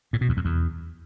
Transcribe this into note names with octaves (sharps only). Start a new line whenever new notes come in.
A2
B2
E2
F2
E2